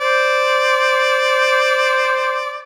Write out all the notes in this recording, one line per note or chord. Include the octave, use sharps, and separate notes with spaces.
C5 D5